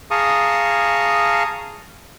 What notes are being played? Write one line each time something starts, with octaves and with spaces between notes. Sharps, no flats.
G#4 F5 A5 A#5 C#6 D#6